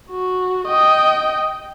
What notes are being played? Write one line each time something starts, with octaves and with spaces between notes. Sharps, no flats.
F#4
D#5 G5